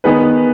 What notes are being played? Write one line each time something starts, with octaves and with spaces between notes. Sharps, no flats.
D#3 B3 D#4 G#4 B4